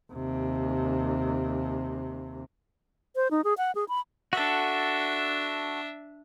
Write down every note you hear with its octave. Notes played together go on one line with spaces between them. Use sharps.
D#2 C3
C5
D#4
G#4
F#5
G#4
B5
D4 F#4 A4 E5